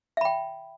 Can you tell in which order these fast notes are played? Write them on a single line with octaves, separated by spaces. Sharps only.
E5 B5 G5